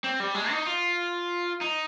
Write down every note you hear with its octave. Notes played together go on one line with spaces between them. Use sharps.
C4
G3
G#3
D#4
F4
D#4